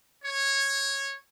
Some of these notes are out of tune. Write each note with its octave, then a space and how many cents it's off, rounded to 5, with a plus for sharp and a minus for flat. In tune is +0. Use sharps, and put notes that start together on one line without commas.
C#5 -10